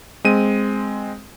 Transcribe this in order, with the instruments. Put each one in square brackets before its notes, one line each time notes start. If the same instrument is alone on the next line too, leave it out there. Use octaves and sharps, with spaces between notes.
[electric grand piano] G#3 C4 D#7